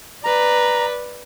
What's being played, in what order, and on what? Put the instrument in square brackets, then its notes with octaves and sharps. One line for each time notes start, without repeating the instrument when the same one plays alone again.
[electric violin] B4 D5 [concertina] A#5